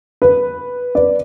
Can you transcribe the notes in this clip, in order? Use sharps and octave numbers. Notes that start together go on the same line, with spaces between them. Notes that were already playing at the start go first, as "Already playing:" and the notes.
B4
B4 D5